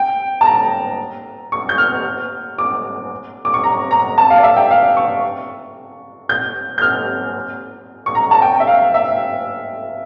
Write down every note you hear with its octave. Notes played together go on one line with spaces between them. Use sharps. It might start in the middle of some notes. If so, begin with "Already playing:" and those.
Already playing: G5
A5
A#5
C#6
G6
F6
D6
D6
C#6
A#5
A#5
A5
F5
D5
E5
G5
F5
C#6
G6
G6
F6
C#6
A#5
A5
G5
E5
F5
E5